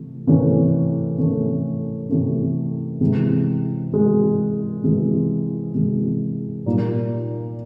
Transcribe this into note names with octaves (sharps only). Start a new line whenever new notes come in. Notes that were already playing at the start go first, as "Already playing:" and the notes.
Already playing: C3 E3 A3
C3 E3 A3 C#4
C3 E3 A3 C#4
C3 E3 A3 C#4
C3 E3 G#3
C3 E3 G#3
C3 E3 G#3
C3 E3 G#3
A#2 G3 A#3 D#4